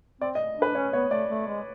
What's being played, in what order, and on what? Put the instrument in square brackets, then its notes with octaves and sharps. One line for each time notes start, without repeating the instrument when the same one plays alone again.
[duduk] C4 [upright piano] D5
[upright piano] D#5
[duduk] D4 [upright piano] B4
[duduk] C#4 [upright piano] C#5
[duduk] B3 [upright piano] C#5
[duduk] A3 [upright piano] D5
[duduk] A3
G#3